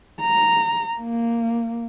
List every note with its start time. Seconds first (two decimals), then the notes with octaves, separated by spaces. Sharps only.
0.21 A#5
1.00 A#3